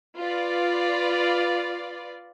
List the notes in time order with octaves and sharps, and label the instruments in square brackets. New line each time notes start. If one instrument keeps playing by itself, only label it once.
[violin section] F4 B4 D5